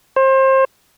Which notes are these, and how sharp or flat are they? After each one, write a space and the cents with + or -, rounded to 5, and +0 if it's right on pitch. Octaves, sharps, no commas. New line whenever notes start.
C5 +30